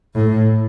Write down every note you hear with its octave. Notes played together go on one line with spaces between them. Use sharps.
A2